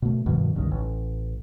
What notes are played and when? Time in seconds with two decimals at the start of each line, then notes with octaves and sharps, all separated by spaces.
0.02 B2 A3
0.26 G2 B2 D#3 F3
0.56 G1 C#2 A#2 D#3
0.71 A1